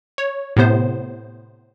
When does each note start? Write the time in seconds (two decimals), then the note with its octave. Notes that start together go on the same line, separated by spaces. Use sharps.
0.18 C#5
0.56 A2 C3 B3 C5